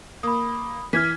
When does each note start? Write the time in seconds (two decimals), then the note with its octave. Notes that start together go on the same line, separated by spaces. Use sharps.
0.23 A#3 B5 D#6
0.93 E3 F6 G#6 B6